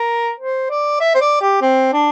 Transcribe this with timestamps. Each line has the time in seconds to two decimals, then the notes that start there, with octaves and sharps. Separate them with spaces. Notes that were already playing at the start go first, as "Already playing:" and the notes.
Already playing: A#4
0.40 C5
0.70 D5
1.00 E5
1.15 C5
1.21 D5
1.41 G4
1.62 C4
1.93 D4